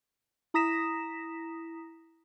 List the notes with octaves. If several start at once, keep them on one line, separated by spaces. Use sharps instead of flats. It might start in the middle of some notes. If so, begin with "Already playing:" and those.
E4 A#5 D#6 A#6 B6 E7